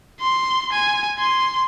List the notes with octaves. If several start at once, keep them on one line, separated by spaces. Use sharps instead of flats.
C6
G#5
C6